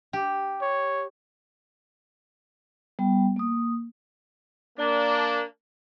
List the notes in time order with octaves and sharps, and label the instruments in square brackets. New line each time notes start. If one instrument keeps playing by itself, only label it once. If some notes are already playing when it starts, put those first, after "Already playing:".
[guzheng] G4
[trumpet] C#5
[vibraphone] G3 B3 G5
A#3 D#6
[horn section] A#3 D4